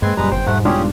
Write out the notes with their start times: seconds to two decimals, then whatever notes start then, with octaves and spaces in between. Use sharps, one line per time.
0.02 G2 G#3 A#3 C4 B4 C6 G#6
0.17 F#1 F#2 A#2 G3 G#3 B4 A#5
0.32 G1 C5 G5
0.47 E1 G#2 G3 A3 F#5
0.65 G#2 B2 C#4 D4 F4 G4 G#4